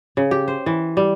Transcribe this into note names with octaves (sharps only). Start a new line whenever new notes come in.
C#3
G4
C5
E3
G3